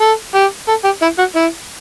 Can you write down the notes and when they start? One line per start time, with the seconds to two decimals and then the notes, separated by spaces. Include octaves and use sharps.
0.01 A4
0.35 G4
0.68 A4
0.84 G4
1.02 E4
1.19 F#4
1.35 E4